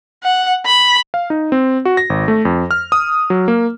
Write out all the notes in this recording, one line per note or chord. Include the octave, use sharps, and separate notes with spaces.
F#5
B5
F5
D#4
C4
F#4
A#6
G#1
A3
F2
F6
D#6
F#3
A#3